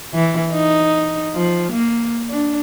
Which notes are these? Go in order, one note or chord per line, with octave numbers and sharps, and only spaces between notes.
E3
D#4
F3
A#3
D4